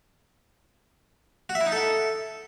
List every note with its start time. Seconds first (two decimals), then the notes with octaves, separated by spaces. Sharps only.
1.49 F#4
1.55 E5
1.61 E4
1.66 D#4
1.72 A4